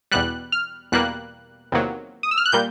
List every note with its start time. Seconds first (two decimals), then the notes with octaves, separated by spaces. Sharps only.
0.12 E2 B2 G3 F#6
0.52 F6
0.92 E2 B2 G3 A#3 F#6
1.72 E2 C3 D#3 F#3 A#3
2.23 D#6
2.31 E6
2.38 F6
2.46 F#6
2.52 A#2 G3 A#3 G6